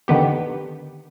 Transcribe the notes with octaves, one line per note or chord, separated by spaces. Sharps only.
D3 D#3 B3 G4